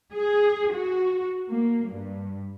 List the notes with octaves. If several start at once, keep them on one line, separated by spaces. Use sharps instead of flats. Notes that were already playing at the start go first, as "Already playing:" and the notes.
G#4
F#4
A#3
G2